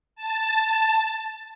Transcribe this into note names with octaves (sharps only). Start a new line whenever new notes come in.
A5